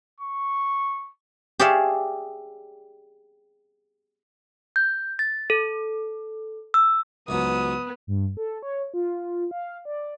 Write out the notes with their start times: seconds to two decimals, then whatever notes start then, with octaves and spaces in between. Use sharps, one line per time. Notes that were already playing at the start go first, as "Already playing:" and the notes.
0.20 C#6
1.59 G4 G#4 C#5 D5 E5 F5
4.76 G6
5.19 A6
5.50 A4
6.74 E6
7.28 C#2 G#2 F#3 B3 D#6
8.07 G2
8.37 A4
8.62 C#5
8.94 F4
9.51 F5
9.85 D5